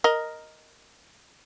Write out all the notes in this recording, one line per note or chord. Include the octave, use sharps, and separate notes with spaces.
A#4 D#5